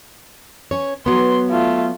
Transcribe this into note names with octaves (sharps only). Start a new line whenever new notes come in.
C#4 C#5
F#3 B3 C6
A3 F4